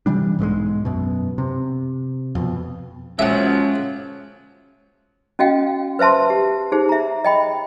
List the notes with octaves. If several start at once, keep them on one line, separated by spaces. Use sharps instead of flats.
C3 E3 G3 D4
B1 G#2 G3 G#3
F#2 B2
C3
F2 B2
F3 F#3 G#3 A#3 C#4 E5 F#5
C#4 F#4 D#5 F5 G5
B4 C5 E5 A5 C6
G4
D#4 G4 G#4 C5
E5 A#5
D#5 G5 B5